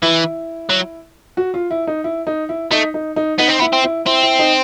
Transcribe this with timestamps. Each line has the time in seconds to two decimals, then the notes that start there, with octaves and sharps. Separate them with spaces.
0.03 E3 E4
0.70 F#3
1.37 F#4
1.54 F4
1.71 E4
1.87 D#4
2.04 E4
2.27 D#4
2.49 E4
2.71 A3 D#4
2.94 D#4
3.16 D#4
3.39 B3 D#4
3.49 C4
3.60 B3 E4
3.73 C4
3.84 E4
4.06 C4 E4
4.22 E4
4.39 D#4